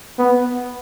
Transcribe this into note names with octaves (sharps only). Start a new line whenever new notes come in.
B3